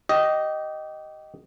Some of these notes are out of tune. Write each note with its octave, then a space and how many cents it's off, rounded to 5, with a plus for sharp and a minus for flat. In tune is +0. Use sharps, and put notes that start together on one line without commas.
G4 -20 D#5 +0